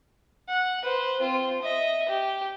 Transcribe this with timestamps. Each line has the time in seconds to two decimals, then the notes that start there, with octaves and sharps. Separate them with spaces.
0.48 F#5
0.82 B4 C5
1.20 C4 F4
1.62 D#5 E5
2.09 G4